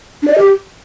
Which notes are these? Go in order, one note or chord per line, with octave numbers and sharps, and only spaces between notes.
D4
D5
D#5
G4